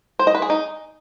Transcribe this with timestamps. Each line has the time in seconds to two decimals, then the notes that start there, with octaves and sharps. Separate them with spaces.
0.19 C5
0.27 D#5
0.35 B4
0.42 G#4
0.50 D#4